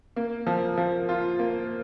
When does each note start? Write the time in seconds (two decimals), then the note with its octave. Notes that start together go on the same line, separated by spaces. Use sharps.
0.16 A#3
0.47 F3
0.77 F3
1.09 F4
1.39 A#3